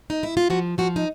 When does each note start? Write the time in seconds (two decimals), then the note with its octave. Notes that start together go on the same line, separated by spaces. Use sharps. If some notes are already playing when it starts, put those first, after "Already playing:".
0.10 D#4
0.23 E4
0.37 F4
0.50 F3 F#4
0.78 F3 F#4
0.96 D#4